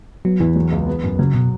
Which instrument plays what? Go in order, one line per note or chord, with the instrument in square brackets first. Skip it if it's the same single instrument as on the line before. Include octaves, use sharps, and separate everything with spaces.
[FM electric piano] F#3 [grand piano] B3
[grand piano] E2 [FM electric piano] E3
[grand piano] F#3
C#2
B3
F#2
[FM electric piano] C#3 [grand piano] F#3
[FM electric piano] B2